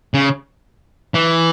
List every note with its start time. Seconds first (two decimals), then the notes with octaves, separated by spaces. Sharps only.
0.14 C#3
1.14 E3